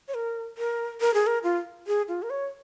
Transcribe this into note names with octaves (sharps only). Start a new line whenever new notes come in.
C#5
A#4
A#4
A#4
G#4
A#4
F4
G#4
F4
A#4
C#5